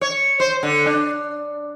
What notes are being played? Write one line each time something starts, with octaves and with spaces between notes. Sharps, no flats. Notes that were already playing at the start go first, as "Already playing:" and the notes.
C#5
C5
D3
D4